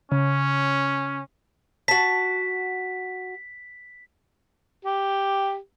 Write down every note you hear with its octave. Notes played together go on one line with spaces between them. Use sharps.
C#3 C#4
F#4 A5 B6
G4